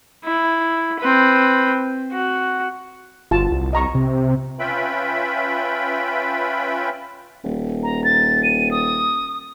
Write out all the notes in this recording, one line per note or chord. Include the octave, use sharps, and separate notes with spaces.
E4
C4 B4
F#4
G1 F4 F#4 A5
C2
D#5 A#5 C#6
C3
C#4 F4 B4 E5 G5 B5
D#1
A#5
A6
D#7
D#6